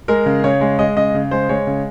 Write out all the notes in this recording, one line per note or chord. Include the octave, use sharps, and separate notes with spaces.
G#3 A#4
C#3
C#3 C#5
G#3
G#3 D#5
C#3 D#5
C#3
G#3 C5
G#3 C#5
C#3